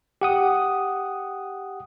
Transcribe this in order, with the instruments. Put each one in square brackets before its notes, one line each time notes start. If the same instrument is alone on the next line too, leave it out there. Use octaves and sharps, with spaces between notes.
[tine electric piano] G4 F#5 D#6